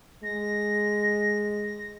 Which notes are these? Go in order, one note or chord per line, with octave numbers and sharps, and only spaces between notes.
G#3 A#6